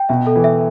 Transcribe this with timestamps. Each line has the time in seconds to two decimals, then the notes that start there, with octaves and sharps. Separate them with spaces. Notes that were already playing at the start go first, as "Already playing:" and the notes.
Already playing: G5
0.09 B2 E5
0.27 A4
0.36 E3
0.44 E5